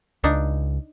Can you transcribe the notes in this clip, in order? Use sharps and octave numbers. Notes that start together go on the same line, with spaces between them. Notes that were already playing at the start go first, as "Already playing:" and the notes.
C#2 D4 D#4